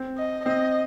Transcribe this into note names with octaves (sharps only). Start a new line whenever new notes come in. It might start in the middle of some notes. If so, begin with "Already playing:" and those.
Already playing: C4
D#5
C4 D#5